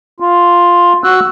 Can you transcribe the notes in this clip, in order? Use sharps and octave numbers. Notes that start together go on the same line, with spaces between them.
F4
F#4 E6 F#6